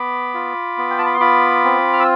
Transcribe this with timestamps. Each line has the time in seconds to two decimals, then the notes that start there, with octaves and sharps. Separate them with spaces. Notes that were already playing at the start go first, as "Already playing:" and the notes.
Already playing: B3 B5 D6
0.34 F4
0.78 B3
0.90 G5
0.99 A5
1.06 B5
1.14 C6
1.20 F4 B5 D6
1.64 C4
1.93 F6
2.00 E6